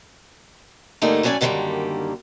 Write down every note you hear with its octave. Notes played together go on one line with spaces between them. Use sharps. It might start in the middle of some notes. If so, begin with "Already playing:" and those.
G2 D3 G3 A3 A#3 D#4
A2 F#3 C#4 D5 G#5
F#2 D3 D#3 F#3 G3 A#3